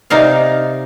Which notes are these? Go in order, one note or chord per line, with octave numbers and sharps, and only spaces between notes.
C3 D#4 D5 F5